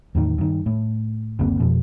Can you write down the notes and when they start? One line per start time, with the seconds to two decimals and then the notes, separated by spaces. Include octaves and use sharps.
0.15 E2 A2 D#3
0.38 G2 D#3
0.66 A2
1.39 F#1 D2 A#3 C4
1.59 F2 B2 F3